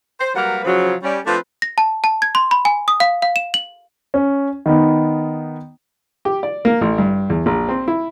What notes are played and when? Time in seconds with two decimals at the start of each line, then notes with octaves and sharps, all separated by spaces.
0.20 C5
0.35 F#3 G3 A#3 A#4 B4 F#5
0.65 C#3 F3 F#3
1.03 G3 C#4 D5
1.26 F3 A3 C4 D4 F4 B4
1.62 A#6
1.78 A5
2.04 A5
2.22 G#6
2.35 C6
2.51 B5
2.65 G#5
2.88 D#6
3.00 F5
3.22 F5
3.36 E7
3.54 F#7
4.14 C#4
4.66 D#3 B3 D#4
6.25 G4
6.43 D5
6.65 A#3
6.81 A1
6.98 G2
7.30 E2
7.46 A#1
7.69 C4
7.88 E4